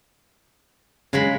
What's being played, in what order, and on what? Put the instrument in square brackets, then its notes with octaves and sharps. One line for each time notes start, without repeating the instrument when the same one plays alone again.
[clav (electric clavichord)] C#3 [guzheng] F#3 G#3 B5